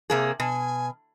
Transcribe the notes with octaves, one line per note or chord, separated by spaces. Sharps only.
C3 A#3 G#4
B2 G#5